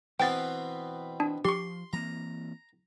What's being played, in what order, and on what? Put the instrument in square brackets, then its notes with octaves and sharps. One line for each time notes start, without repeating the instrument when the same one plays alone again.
[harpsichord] B2 B3 C4 [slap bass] E3 [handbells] G5 A6
[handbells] D4
[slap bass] F3 [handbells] G4 C#6 [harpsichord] C6
[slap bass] E3 A#3 C4 [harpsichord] A#5